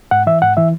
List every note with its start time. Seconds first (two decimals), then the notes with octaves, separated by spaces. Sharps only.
0.11 G#2 F#5
0.27 E3 E5
0.42 G#2 F#5
0.57 E3 E5